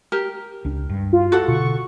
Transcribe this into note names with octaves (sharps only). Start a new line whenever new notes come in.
G4 A#4
C#2 D4
G2
F4
F#4 A4 F#5
B2 D3 C#6